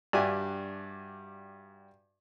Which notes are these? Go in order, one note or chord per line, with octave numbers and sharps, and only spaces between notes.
G2 D4 F#4 G4 E5 G#5